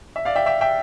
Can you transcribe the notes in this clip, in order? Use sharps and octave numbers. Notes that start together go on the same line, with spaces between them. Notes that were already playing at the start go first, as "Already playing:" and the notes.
E5
D5 F5
E5 G5
E5 G5
E5 G5